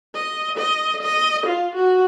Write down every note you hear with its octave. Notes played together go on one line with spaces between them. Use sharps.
D#5
D#5
D#5
F4
F#4